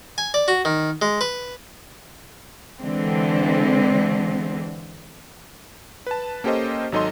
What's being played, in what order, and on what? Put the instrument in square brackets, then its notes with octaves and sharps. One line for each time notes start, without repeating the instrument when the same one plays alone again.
[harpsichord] G#5
D5
F#4
D#3
G#3
B4
[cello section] D3 E3 G#3 C4
[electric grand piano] B4 A5
A#3 C#4 G4 A4 C5 D#5
G#1 F#3 D#4 A4 D#5 C6